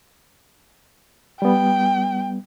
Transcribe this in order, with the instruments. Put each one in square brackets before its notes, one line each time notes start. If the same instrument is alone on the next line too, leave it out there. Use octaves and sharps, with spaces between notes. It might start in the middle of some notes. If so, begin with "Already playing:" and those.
[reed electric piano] G3 B3 [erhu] G5